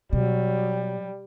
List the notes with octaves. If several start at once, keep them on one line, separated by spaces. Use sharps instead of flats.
B2 F#3 G3